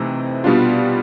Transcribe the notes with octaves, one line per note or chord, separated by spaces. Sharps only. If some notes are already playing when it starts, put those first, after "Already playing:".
Already playing: C3 E3 A3 C4 D#4
B2 G3 B3 D4 F4